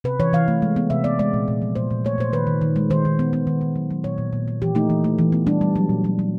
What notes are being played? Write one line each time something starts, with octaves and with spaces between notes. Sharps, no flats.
C3 B4
E3 C#5
E3 F5
A3
G#3
B3
C3 E5
B3 D5
G#3 D5
A#2
A#2
F3
A#2 C5
A#2
A3 C#5
A#2 C5
D#3 B4
D#3
D#3
G#3
D#3 C5
D#3
B3
B3
D#3
D#3
F#3
F#3
A#2 C#5
A#2
A#2
A#3
E3 G4
A3 D#4
E3
A3
E3
B3
G3 D4
G3
F#3
A#2
F#3
F#3